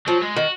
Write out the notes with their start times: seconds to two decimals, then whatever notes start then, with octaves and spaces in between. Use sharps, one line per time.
0.07 F3 F#3
0.21 G#3
0.36 D#3 F#4